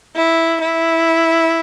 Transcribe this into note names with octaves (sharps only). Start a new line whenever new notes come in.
E4
E4